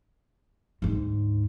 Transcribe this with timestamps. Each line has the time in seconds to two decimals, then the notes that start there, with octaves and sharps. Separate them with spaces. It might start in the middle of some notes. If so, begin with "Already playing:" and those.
0.82 D2 G#2